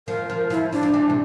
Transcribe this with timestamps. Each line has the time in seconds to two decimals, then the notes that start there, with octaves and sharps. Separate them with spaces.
0.08 F3 A#4
0.30 F3
0.50 F3 E4
0.72 F3 D4
0.83 F3
0.94 E3
1.10 C3